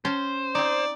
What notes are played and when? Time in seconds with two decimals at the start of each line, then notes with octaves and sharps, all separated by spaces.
0.05 C#4 C5 G5 A5
0.55 C4 D#4 D5